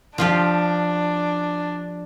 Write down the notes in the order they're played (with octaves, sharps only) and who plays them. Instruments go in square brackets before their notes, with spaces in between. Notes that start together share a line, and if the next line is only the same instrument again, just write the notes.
[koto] F3 F4 G4 [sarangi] D4